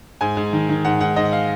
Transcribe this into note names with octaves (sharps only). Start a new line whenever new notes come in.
G#2 G#5
G#2
D#3
D#3
G#2 F#5
G#2 F#5
G#2 D#5
F5